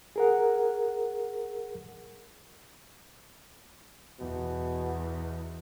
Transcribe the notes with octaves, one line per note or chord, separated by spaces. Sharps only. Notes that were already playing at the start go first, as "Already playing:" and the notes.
G#4 A#4 F#5
E2 B2